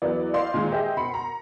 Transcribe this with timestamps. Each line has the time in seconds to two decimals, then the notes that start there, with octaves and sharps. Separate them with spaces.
0.02 E2 E3 F#3 B3 D5
0.33 C5 D5 D#5 F5 C6
0.54 A#2 D#3 G#3
0.72 G4 G#4 C5 D#5 E5 G5
0.97 B2 B5 C6 C#7
1.14 A#5